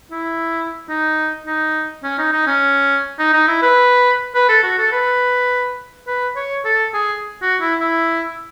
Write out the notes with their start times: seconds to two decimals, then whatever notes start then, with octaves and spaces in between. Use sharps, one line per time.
0.11 E4
0.89 D#4
1.46 D#4
2.03 C#4
2.18 D#4
2.32 D#4
2.47 C#4
3.19 D#4
3.33 D#4
3.48 E4
3.62 B4
4.34 B4
4.49 A4
4.63 F#4
4.78 A4
4.92 B4
6.07 B4
6.36 C#5
6.65 A4
6.93 G#4
7.42 F#4
7.61 E4
7.80 E4